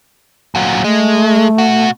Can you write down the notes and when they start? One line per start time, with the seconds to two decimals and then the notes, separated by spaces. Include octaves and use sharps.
0.55 A#2 F#3
0.84 G#3 A3
1.58 B2 F#4